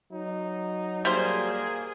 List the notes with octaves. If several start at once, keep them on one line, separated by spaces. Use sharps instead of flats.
F#3 D#4
G3 A#3 G#4 C5